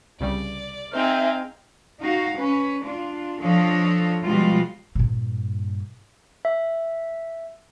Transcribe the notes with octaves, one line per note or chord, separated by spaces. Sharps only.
C2 C#3 G3 D5
C4 D#4 G#4 E5 F5 G5
D#4 F#4 F5
C#4 B4
D4 F4
F3 D4 A4 C#5 D#5 F5
B2 F3 G3 G#3 F4 F#4
G2 A#2
E5